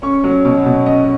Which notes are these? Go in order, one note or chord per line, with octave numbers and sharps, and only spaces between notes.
C#4 C#6
F#3
B2
B2
C#4 D#5